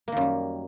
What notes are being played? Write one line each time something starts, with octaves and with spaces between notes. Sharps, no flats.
F#2 D#3 G3 A#3